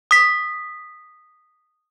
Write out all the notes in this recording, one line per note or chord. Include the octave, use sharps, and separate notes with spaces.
D#6 B6